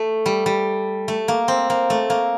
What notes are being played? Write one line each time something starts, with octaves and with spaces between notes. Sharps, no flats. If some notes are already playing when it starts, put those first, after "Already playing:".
Already playing: A3
G3
G3
A3
A#3
C4
A#3
A3
A#3